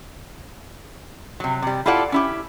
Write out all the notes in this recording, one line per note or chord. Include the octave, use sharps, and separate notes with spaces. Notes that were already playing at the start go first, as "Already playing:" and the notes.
C3 F#3
C3 G3
E4 F4 G4 A4 D5 F#5
C#4 E4 G4